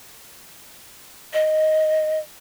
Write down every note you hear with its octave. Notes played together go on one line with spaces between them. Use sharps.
D#5